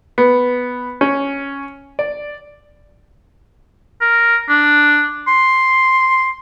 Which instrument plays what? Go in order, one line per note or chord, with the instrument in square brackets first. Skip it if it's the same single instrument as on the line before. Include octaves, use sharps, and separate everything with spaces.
[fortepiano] B3
C#4
D5
[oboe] A#4
D4
C6